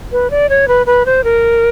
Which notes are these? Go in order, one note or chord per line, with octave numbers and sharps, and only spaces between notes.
B4
D5
C#5
B4
B4
C5
A#4